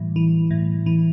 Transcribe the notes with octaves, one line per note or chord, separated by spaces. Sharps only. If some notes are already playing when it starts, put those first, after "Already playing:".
Already playing: A2 E3 G3
E3
A2
E3